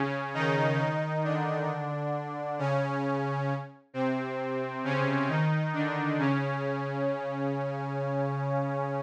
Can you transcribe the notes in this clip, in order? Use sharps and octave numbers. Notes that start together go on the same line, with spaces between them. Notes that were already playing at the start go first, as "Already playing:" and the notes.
Already playing: C#3 C#4
D#3 D#4
D#3 D#4
D3 D4
C#3 C#4
C3 C4
C#3 C#4
D#3 D#4
D3 D4
C#3 C#4